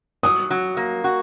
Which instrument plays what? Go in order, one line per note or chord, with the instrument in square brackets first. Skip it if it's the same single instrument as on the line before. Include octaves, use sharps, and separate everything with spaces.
[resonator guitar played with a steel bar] F#3 [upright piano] D#6
[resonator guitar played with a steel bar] F#3
A#3
F#4